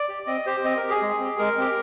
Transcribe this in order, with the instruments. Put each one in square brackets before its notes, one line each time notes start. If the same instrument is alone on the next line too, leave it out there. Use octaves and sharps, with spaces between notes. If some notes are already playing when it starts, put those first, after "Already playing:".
Already playing: [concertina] D5
G4
C4 D#5
G4 C5
C4 D#5
A#4
G4
G#4
G#3
C4 G4
G#3 A#4
C4 G4